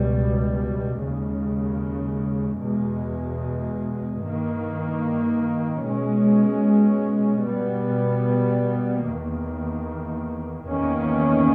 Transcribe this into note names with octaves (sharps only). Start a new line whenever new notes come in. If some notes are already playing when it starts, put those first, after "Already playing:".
Already playing: C#2 B2 G3
D#2 C#3 G#3
E2 B2 G#3
G2 D#3 A#3
B2 G#3 C#4
B2 G3 B3
E2 D#3 A#3
E2 D#3 A#3 C#4